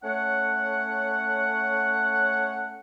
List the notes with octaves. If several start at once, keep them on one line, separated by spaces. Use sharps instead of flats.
A3 C#4 C#5 F#5